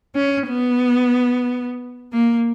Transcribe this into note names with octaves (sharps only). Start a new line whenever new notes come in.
C#4
B3
A#3